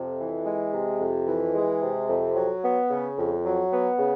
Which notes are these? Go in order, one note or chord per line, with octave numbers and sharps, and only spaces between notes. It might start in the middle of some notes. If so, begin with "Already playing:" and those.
Already playing: F2 C3
E3
G#3
C3
F2
E3
G#3
C3
F2
F#3
B3
C#3
F2
F#3
B3
C#3